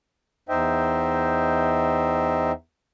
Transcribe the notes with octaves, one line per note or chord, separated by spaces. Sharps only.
E2 D#4 C5 D#5 E5 G5